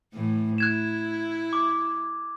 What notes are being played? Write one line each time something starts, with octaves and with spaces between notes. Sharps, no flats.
A2 E3
E4 F#6 G#6 E7
D6